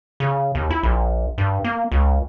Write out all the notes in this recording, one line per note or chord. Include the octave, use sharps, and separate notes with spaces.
C#3
D#2
E4
A#1
G2
A#3
C#2